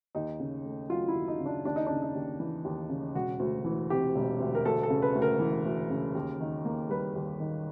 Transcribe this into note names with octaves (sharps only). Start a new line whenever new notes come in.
D#2 D#4
C#3
A3
F#3 F4
E4
D#2
D#4
C#3
D4
D#2 D4
D#4
C#3 D4
D#4
D#2
E3
D#2
C#3
E1 F#4
D2
E3
C3 G4
E1
D2
A#4
D2 A4
A4
C#3
B4
D2
A#4
E3
D2
C#3
D#2
D#3
A#3
G3 B4
D#2
D#3